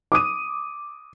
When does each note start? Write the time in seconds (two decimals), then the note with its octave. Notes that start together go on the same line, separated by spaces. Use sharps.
0.12 D6 D#6 D#7